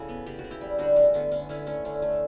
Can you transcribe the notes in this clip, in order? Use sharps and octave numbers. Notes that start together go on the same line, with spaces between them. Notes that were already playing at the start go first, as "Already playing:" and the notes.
Already playing: C#3 C#4 E4 F#4 A4
B3
C#3 G4
F#4
C#3
E4 G4
G3
D3 D4 F#4
A3 C#4
D3 B3
D3 C#4
D3 C#4 E4
A3 C#4
D3 C#4
A3